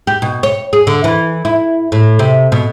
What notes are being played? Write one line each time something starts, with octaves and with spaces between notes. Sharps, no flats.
G4
B2
C#5
G#4
D3
E3
E4
A2
C3
B2